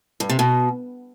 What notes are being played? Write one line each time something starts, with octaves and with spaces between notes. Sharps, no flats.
G2
C3
B2